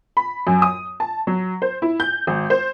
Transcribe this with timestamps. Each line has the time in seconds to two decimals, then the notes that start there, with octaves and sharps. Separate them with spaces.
0.17 B5
0.47 F#2
0.62 D#6
1.00 A5
1.27 F#3
1.62 C5
1.82 E4
2.00 G6
2.27 G#1
2.50 C5